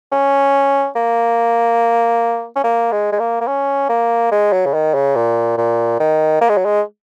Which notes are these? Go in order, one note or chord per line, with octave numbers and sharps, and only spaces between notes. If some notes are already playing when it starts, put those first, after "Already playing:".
C#4
A#3
C#4
A#3
G#3
G#3
A#3
A#3
C#4
A#3
G#3
F#3
C#3
D#3
C#3
A#2
A#2
D#3
A#3
G#3
F#3
G#3